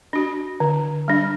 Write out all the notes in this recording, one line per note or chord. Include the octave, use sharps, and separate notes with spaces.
D4 F#4
D3
G3 D4